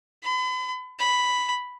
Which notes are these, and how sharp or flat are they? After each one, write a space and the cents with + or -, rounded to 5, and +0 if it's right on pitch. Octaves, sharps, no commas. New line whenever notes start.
B5 +40
B5 +0